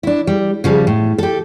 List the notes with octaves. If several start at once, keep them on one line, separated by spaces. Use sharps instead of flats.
D4 E4
G3
C#3 F3 G3
A2
G4 A4